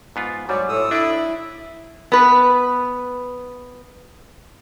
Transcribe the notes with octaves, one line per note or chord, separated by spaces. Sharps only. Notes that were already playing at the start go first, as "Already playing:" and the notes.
G#2 B3 F4
G#2 F#3 G3 D5
A2 D#6 E6
D4 E4 D5
B3 B4